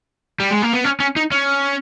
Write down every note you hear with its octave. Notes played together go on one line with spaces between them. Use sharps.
G3
G#3
A#3
B3
C#4
C#4
D#4
C#4